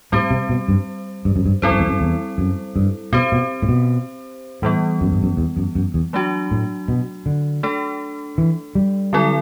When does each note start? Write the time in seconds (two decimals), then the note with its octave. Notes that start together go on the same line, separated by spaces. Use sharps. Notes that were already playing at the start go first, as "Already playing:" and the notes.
0.12 A2 G3 C4 G4 C5
0.31 C3
0.49 B2
0.68 G2
1.25 G2
1.36 F#2
1.46 G2
1.62 G2 G3 C4 E4 A4 C5
1.71 F#2
1.79 E2
1.87 F#2
2.01 E2
2.38 F#2
2.76 G2
3.13 B2 C4 G4 C5
3.32 B2
3.62 A2
3.69 B2
4.62 A2 E3 G3 B3
5.01 F#2
5.12 G2
5.23 F#2
5.37 E2
5.57 F#2
5.75 F#2
5.94 E2
6.13 F#3 A3 D4 F#4
6.51 A2
6.88 B2
7.26 D3
7.63 A3 D4 A4
8.38 E3
8.75 G3
9.13 D3 F#3 C4 E4 A4